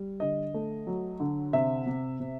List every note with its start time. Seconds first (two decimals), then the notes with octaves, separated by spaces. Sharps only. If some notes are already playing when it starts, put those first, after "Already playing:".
Already playing: G3
0.20 D3 D#5
0.54 A3
0.87 F#3
1.20 D3
1.53 C3 E5
1.86 C3
2.20 C3